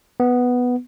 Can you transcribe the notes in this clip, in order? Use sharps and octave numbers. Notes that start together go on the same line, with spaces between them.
B3